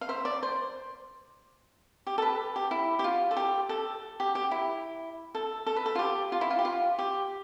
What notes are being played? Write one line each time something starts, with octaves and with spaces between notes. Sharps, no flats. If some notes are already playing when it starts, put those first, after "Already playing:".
F5
C5 E5
D5
C5
G4
A4
B4
G4
E4
G4
F4
A4
G4
A4
G4
G4
E4
A4
A4
B4
A4
F4
G4
F4
E4
F4
G4
F4
G4